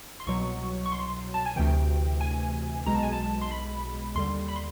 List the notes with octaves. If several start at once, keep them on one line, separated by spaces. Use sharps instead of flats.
C6
C2 B2 F#3 C#6
C#6
C6
A5
G#5
D2 C3 E3 G5
G#5
B1 B2 G#3 A#5
A5
G#5
A5
C6
B5
D#2 D3 G3 C6
B5
C6